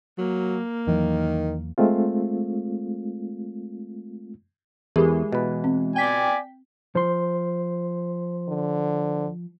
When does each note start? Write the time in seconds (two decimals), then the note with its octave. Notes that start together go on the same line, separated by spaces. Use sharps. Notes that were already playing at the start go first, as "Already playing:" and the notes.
0.18 F#3 A#3
0.87 E2 D#3 E3 F#3
1.78 G#3 A3 C4 F4
4.96 E2 E3 G#3 G4 G#4 A#4
5.33 B2 B4
5.64 C4
5.96 D5 G5 G#5 B6
6.95 F3 C5 C6
8.49 D3